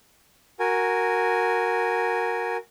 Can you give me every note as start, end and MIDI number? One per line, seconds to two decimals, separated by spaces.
0.60 2.57 66
0.60 2.57 70
0.60 2.57 80